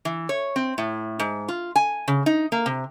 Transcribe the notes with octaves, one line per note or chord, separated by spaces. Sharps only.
E3
C#5
C4
A2
G#2
F4
G#5
C#3
D#4
A#3
C3